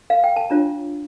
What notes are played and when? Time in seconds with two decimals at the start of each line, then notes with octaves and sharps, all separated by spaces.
0.10 F5
0.24 G5
0.36 A5
0.50 D4 F4 C#5 A#5